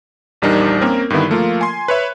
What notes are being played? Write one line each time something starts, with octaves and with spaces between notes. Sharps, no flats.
A#1 E2 G3 D4 D#4 A#4
A#3 C4 C#4 A#4
G2 D3 D#3 B3 E4
F3 A3 A#3 F4
G#5 C6
B4 C#5 E5